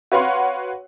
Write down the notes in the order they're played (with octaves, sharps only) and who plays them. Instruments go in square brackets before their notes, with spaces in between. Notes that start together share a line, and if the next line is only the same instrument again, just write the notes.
[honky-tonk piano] F#4 B4 C#5 F5 F#5 C6